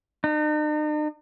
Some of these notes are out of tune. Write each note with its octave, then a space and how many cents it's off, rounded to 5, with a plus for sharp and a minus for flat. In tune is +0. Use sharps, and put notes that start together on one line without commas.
D#4 -45